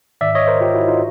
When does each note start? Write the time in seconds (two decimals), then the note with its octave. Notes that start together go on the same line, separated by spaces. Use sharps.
0.21 G#2 D#3 D5 E5
0.35 C#5 D#5
0.47 A#4 C5
0.61 F4 G4
0.74 E4 F#4
0.88 D#4 F4